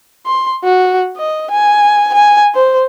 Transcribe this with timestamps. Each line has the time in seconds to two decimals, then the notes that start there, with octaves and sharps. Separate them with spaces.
0.26 C6
0.64 F#4
1.17 D#5
1.51 G#5
2.14 G#5
2.55 C5